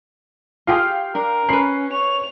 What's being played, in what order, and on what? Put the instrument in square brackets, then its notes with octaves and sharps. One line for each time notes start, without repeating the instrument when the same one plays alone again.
[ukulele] F4 G4 G#4 [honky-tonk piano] F5 G5 F6
[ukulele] D4 [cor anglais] A#4
[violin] C#4 [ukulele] B4 B5 [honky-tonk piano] C7
[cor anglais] C#5 [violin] F7